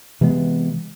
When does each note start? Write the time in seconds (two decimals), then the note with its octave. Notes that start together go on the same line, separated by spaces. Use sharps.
0.21 C3 E3 G#3 B3